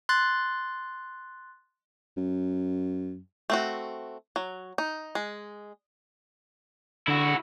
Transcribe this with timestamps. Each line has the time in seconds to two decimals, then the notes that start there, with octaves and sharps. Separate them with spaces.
0.09 C6 F#6 A6
2.17 F#2
3.50 A3 C4 F#4
4.36 F#3
4.78 D#4
5.15 G#3
7.08 D3 E4 F#4